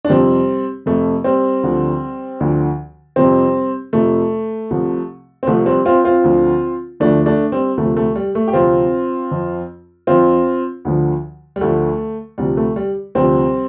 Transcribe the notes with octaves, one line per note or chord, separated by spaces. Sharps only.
D4
F2 C3 F3 G3 C4
F2 C3 F3 A3
G3 C4
D2 D3 F3
D2 D3 F3
F2 C3 F3 G3 C4
F2 C3 F3 A3
C2 C3 F3
C4
C2 C3 F3 A3
G3 C4
C4 F4
C4 F4
D2 D3 F3
D2 D3 F3 A3 D4
A3 D4
G3 C4
D2 C3 F3 A3
A3
G3
A3
G4
D2 C3 F3 C4 F4
F2 F3
F2 F3 C4 F4
D2 D3 F3
G3
D2 D3 F3 A3
D2 C3 F3 G3
A3
G3
D2 C3 F3 G3 C4